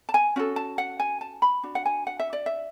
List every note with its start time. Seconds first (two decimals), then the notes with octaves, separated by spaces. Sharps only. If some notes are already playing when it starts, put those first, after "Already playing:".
0.09 A5
0.14 G#5
0.36 C#4 F#4 A4
0.56 A5
0.78 F#5
1.00 G#5
1.21 A5
1.42 B5
1.63 D4 F#4
1.75 F#5
1.86 G#5
2.07 F#5
2.19 E5
2.33 D5
2.46 E5